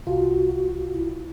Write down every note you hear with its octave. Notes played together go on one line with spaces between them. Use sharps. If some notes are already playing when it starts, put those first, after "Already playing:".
C2 F4 F#4
E4